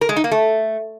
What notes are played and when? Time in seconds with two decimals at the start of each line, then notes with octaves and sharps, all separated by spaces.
0.01 A#4
0.09 G#3
0.16 D#4
0.24 A#3
0.32 A3